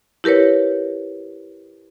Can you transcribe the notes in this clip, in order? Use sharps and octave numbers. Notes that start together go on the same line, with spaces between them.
E4 G4 A#4 B4 C#5